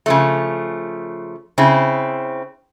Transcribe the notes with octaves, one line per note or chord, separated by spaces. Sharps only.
C#3 F3 A3
C#3 C4 E4